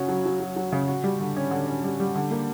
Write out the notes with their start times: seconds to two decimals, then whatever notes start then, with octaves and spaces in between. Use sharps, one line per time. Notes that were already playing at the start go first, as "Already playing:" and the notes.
Already playing: C#3 C#4 F#4
0.08 F#3
0.25 F#3
0.40 F#3
0.56 F#3
0.72 C#3
0.88 F#4
1.04 G3
1.20 D3
1.36 C#4
1.51 D3
1.67 C#4
1.84 G3
2.00 G3
2.15 D3
2.31 A#3